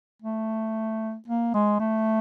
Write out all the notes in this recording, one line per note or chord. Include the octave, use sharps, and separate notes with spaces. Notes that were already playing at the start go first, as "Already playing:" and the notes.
A3
A#3
G#3
A3